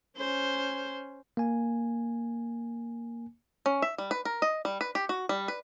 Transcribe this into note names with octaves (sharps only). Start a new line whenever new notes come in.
C#4 C5
A#3 G#5
C#4
E5
G3
B4
A#4
D#5
G3
B4
G4
F#4
G3
B4